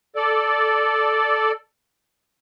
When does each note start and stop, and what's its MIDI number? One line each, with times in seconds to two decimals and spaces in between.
0.16 1.52 69
0.16 1.52 74